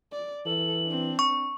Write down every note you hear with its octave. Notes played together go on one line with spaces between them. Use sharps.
D5
E3 A4 F#7
C4 D4
C#6